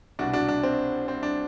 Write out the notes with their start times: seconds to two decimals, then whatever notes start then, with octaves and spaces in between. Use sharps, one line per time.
0.19 C2 B2 D4 F#4
0.33 D4 F#4
0.48 D4
0.63 C4
1.08 C4
1.23 D4